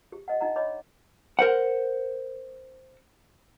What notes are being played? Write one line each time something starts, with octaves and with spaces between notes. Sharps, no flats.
G4
D#5 F#5
D4 D#4 D#5 F#5 A#5
C#5 D#5 B5 D6
A#4 C5 F#5